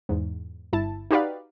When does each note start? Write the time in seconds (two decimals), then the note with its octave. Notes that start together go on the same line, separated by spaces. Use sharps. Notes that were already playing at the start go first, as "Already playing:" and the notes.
0.09 E2 G#2
0.73 G1 E4 A5
1.11 D#4 F#4 G4 B4 D5 F5